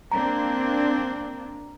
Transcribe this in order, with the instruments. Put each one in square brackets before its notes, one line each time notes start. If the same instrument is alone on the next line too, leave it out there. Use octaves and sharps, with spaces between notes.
[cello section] A#3 C4 D4 [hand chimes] A#5